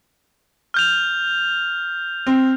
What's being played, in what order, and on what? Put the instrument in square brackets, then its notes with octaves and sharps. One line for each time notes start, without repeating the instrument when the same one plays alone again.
[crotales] F6 G6 F7
[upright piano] C4